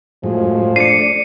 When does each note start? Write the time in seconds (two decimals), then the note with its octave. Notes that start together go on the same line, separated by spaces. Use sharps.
0.23 F#2 A2 F3 G#3
0.76 A3 D4 D5 C7 C#7 D#7